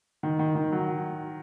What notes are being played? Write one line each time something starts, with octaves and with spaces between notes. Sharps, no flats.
D#3
D#3
D#3
F#3